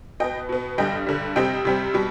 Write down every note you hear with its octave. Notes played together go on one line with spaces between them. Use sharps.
B2 B3 D#5 G5
B2 B3
G2 D3 G3 D#5 G5
G2 D3 G3
C3 G3 C4 D#5 G5
C3 G3 C4
B2 G3